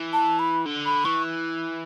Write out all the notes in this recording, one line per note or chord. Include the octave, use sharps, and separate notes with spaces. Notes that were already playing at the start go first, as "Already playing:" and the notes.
Already playing: E3
A5
B5
D3
B5
E3 C#6